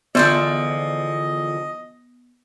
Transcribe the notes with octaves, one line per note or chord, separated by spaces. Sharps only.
E2 D3 F3 B3 F4 C5 D5 D#5